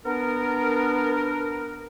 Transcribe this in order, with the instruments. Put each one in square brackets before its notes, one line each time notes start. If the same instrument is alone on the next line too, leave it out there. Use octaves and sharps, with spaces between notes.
[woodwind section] B3 D4 A#4